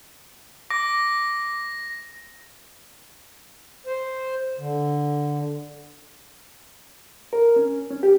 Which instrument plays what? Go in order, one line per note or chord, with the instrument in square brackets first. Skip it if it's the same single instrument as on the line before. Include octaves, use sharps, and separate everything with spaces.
[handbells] D6 [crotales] A#6
[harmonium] C5
D3
[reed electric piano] A#4
C#4
C#4
G4